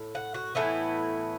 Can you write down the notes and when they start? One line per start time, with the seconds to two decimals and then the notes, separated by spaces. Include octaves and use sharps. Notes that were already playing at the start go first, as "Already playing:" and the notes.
Already playing: A2
0.15 F#5
0.34 F#4
0.55 A2 E3 B3 E4